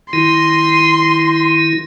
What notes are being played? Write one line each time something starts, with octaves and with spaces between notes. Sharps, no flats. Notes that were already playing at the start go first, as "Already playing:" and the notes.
D#3 E4 C6